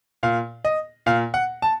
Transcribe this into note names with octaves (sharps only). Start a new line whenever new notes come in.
A#2 F5
D#5
A#2 F5
F#5
A5